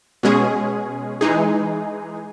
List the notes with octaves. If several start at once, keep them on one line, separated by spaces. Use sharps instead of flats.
B2 G#3 C#4 G#4
E3 G#3 D#4 G#4